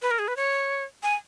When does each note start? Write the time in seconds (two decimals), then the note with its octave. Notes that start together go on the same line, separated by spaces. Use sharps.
0.02 B4
0.11 A#4
0.19 G#4
0.28 B4
0.37 C#5
1.03 G#5